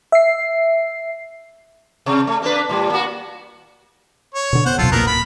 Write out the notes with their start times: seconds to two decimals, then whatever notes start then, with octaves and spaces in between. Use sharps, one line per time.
0.12 E5 C7
2.06 C3
2.27 A3
2.42 A#3 D4 B4
2.69 A2 G3
2.90 A#3 F#4
4.35 C#5
4.53 B2 D3
4.66 F2 B3 C5 F#5
4.78 A#1 F2 C3 F#3 F4 A4
4.92 E2 A#2 A#3 B3 A#4
5.07 D1 B5